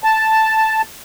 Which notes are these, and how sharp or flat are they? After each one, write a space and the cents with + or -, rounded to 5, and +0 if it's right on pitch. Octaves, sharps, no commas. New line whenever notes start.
A5 +0